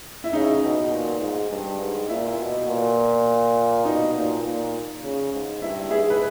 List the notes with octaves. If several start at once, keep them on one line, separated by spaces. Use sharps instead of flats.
E4
C#3 D#4
B2
A#2
G#2
G2
G#2
A#2 E4
B2
A#2
B2 D#4
A#2
A#2
C#3
G#2
G2 E4
G#2 E4 G#4
B4